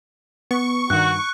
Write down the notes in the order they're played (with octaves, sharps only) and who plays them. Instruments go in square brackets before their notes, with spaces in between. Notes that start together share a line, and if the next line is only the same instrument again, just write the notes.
[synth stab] B3 [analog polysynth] C#6
[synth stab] G2 D#3 [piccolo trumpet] F#4 [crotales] F#6